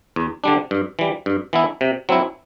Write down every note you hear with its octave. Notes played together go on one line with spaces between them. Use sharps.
E2
D3 G3 D4
G2
E3 G3
G2
E3 B3 E4
C3
F#3 C4 E4